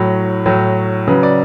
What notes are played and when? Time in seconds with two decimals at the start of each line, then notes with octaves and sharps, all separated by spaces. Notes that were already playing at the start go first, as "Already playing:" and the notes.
Already playing: A2 F#3
0.46 A2 F#3
1.08 C#3 F#3 B4
1.23 D5